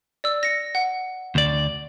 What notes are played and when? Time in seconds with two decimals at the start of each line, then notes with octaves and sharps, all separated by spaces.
0.24 D5 E6
0.43 A#6 C#7
0.75 F#5
1.35 D2 D5